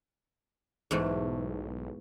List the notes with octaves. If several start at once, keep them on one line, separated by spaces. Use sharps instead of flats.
B1 E2 G#2 A3